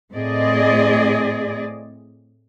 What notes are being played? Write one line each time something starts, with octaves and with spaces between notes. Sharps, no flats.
A2 C4 G#4 D5 D#5